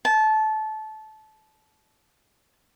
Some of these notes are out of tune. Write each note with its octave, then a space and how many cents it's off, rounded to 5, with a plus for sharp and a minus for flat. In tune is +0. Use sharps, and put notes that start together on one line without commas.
A5 -20